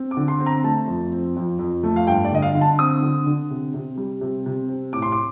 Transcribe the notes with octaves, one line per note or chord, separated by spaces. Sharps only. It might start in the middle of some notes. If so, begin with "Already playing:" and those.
Already playing: C4
D6
D3
C6
C4
A#5
A3 A5
F2
C4
F2
F2
A3
F5
G2 G5
D5
D3 D#5
F5
D3
A5
C4 D#6
D3
D3
C3
C3
G3
C3
C3
C4
A2 D6
C6
D6